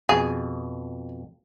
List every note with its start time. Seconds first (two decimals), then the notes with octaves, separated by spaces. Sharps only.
0.09 F2 B2 G#4